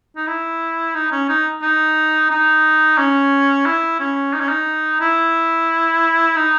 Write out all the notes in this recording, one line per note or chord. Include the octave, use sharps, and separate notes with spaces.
D#4
E4
D#4
C#4
D#4
D#4
D#4
C#4
E4
C#4
D#4
C#4
D#4
E4
D#4